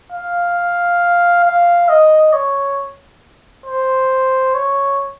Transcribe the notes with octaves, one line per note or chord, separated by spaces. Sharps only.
F5
F5
D#5
C#5
C5
C#5